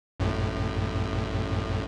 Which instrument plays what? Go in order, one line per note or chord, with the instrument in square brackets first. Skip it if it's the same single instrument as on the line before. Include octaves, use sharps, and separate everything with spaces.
[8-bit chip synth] A1 F#2 A2